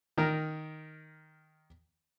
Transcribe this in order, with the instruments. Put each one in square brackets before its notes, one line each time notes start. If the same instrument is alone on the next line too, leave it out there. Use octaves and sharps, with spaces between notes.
[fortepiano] D#3 A#4